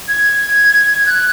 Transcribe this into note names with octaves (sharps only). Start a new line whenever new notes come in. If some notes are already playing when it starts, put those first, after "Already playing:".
G#6
F#6